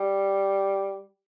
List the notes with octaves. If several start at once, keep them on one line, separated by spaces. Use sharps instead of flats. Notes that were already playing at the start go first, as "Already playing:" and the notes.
Already playing: G3